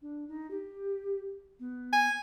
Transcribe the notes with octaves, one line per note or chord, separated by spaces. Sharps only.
D4
D#4
G4
B3
G#5